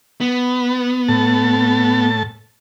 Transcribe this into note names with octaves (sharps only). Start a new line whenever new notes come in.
B3
A2 A5